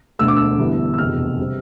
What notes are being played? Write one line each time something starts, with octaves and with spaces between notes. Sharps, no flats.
E1 D2 D3 A3 E6
D6
E6
G1 G2 E3 B3
E6
F1 E2 B2 F6
C3 G3